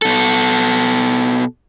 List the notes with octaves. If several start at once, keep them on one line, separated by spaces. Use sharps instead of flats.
B2 A4